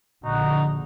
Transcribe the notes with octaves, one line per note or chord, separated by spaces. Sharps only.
A#1 D3 D#4 F#4